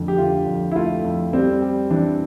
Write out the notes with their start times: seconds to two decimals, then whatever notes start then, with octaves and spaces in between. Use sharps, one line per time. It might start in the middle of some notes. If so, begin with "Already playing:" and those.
Already playing: F2 D3 A3
0.08 G4
0.18 D3 F4
0.47 F2
0.71 E4
0.76 A3 F4
1.04 F2
1.33 G3 C4
1.62 G3
1.91 E3 D4